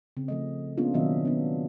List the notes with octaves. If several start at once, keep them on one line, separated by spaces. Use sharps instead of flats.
C#3 C4
F3 A3 D#5
A#3 B3 C#4 D4 F4 G#4
B2 D#3 F#3 C4 D#5 E5
B3 D4